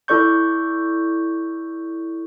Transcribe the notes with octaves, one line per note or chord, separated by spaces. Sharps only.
E4 A4 D5 C#6 G6